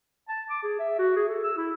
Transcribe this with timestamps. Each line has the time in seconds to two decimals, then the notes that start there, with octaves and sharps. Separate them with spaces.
0.29 A5
0.50 D6
0.63 G#4
0.79 E5
0.98 F#4
1.16 G#4
1.28 A4
1.44 E6
1.57 E4